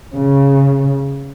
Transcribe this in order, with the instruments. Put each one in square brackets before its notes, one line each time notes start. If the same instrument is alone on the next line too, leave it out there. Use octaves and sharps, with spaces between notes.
[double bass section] C#3